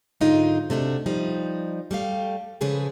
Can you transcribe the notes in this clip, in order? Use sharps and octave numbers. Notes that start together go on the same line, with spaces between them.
G#2 D3 F#3 G#3 D#4 F4
C3 A3 D4 F#4
F3 G3 D#4
G3 A3 G4 F5
C#3 F3 G#3 G#4 A4 B4